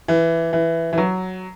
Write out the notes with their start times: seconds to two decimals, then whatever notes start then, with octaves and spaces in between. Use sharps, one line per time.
0.08 E3
0.53 E3
0.93 E3
0.98 F#3